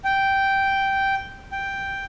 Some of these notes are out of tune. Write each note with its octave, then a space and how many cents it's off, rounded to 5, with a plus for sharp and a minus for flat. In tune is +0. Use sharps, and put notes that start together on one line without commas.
G5 -5
G5 +0